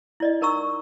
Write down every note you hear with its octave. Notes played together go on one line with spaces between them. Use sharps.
E4 D5 D#5
D#4 A#4 A#5 C#6 E6